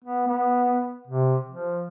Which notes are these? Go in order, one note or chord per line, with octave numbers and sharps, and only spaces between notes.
B3
B3
C3
F3